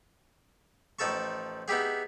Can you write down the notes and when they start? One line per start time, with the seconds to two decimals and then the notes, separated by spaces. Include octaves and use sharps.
0.99 A1 F3 D#4 A4 A5 C#6
1.68 B3 D#4 E4 G4 G#4